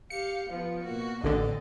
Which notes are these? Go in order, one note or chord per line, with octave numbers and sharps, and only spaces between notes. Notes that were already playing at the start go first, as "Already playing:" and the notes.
G4 F5 C#7
F3 B3
B2 A#3 F#4
A1 D3 C4 A4 D#5